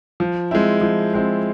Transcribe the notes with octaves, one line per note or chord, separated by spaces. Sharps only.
F3
G#3 C4 E4
F3
G#3 C4 E4